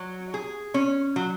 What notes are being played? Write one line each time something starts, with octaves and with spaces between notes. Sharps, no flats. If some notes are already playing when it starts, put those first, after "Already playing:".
Already playing: F#3
G#4
C#4
F#3